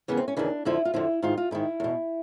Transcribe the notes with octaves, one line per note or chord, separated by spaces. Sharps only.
D#2 C#3 E3 B3
C4
C#4
D#2 C#3 E3 D4
F2 D3 F3 E4
F4
F2 D3 F3 E4
G#2 D#3 F4
F4
G#2 D#3 E4
E2 B2